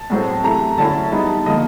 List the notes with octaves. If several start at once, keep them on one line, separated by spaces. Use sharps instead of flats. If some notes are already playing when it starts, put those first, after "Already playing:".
Already playing: A5
A2 F#3 A3 C4
C3 E3 A3 A#5
D3 F#3 A3 C#4 E4 A5
E3 G3 B3 D#4
D3 F3 A#3 D#5